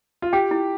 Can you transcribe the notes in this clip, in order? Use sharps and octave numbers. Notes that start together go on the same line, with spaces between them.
F4
G4 G5
E4